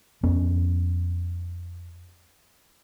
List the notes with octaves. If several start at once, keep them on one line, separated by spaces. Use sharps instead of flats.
F2 B3 C#4